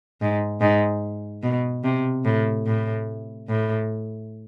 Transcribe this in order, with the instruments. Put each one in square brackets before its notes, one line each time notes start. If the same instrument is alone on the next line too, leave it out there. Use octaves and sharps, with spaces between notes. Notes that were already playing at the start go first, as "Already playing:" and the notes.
[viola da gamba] G#2
G#2
B2
C3
A2
A2
A2